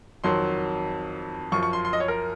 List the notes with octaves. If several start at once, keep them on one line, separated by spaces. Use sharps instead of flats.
F2 D#3 F#3 C6
F#2 F3 C#6
C#6
C6
C6
D#5
C#5
A#4